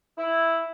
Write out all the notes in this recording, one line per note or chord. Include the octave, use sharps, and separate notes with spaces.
E4